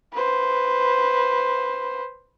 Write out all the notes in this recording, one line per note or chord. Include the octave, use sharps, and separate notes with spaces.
B4 C5